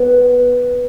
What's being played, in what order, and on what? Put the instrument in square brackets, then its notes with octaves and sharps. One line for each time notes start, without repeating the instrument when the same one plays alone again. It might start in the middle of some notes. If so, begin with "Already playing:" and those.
Already playing: [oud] B3